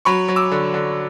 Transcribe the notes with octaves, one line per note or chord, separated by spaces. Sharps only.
F#3 B5 C#6
F#3
D6 E6
D3
D3